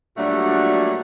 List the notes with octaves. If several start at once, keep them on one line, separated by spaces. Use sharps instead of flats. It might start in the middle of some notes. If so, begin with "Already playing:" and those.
A#2 F#3 G3 A3 D4 F#4